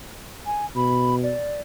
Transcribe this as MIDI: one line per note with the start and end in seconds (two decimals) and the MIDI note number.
0.46 0.66 80
0.76 1.33 47
0.76 1.15 83
1.23 1.61 74